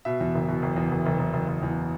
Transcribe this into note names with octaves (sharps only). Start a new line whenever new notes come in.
B2 E5
E2
F#1
B2
F#1
E2
F#1
F#1
F#1
F#1
F#1
E2